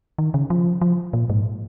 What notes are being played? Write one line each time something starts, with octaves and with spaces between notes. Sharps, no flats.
D#3
C#3
F3
F3
A#2
G#2